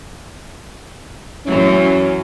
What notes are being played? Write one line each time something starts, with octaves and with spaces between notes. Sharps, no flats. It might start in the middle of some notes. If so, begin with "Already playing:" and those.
F#2 E3 F#3 C#4 E4